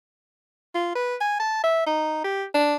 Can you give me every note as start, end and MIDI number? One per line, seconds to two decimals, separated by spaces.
0.74 0.91 65
0.95 1.15 71
1.20 1.37 80
1.39 1.60 81
1.64 1.82 76
1.86 2.21 63
2.24 2.45 67
2.54 2.75 62